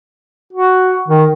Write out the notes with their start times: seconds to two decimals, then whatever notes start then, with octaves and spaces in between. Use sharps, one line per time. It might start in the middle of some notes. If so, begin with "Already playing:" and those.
0.53 F#4
1.08 D#3